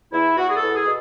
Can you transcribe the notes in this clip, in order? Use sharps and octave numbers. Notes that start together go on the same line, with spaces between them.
E2 E4
E2 F#4
G#4
A4
E2
G#4
B2